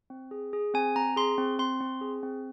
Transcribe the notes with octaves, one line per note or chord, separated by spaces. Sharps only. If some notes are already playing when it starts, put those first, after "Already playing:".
C4
G#4
G#4
C4 G#5
C4 A#5
G#4 C6
C4
C4 C6
C4
G#4
C4